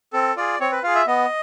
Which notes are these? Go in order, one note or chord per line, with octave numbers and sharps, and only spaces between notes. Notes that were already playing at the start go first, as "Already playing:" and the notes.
C4 A4
F4 G#4 D5
C4 C#5
B4
F4 G#4 F5
E5
B3 D#5